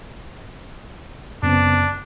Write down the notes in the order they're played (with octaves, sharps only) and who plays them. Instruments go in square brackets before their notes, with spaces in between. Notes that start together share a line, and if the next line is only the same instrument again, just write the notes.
[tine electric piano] F#2 [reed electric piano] C#3 B3 C4 [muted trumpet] D4